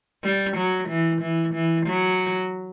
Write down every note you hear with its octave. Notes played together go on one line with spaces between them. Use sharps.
G3
F#3
E3
E3
E3
F#3